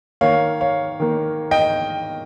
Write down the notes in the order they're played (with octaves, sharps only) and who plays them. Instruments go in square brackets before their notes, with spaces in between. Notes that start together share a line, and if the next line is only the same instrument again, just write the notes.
[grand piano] D#3 A#3 C#5 F5
C#5 F5
D#3 A#3
D#5 G5